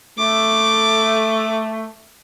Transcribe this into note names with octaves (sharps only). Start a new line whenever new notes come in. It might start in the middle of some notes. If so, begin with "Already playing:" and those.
A3 D6